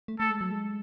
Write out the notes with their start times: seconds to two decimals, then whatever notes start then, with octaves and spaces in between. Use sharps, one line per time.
0.08 A3
0.19 A3 A4
0.30 G#3
0.41 F#3
0.51 G#3